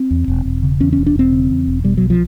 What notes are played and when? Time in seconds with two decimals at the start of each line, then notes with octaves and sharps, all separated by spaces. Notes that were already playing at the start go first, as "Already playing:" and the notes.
Already playing: C4
0.11 E2
0.28 E1
0.45 E1
0.63 C#3
0.80 E2 C#4
0.93 C#4
0.98 E1
1.06 D4
1.15 E1 C4
1.32 C#3
1.50 E2
1.67 E1
1.84 B2 G3
1.97 B1 F#3
2.10 F3